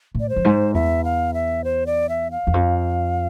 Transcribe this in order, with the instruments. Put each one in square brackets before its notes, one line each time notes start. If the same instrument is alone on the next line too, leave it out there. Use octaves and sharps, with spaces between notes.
[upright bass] A2
[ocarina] D5
C5
[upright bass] F2
G#2
[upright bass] E2 [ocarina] E5
[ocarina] F5
E5
C5
D5
E5
F5
[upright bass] E2
F2